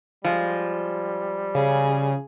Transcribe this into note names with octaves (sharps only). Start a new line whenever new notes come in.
F3 G3 G#3
C#3 G#4